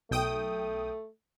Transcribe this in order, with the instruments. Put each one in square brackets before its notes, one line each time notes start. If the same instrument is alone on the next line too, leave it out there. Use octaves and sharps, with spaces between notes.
[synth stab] B1 G5 D#6 [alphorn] A3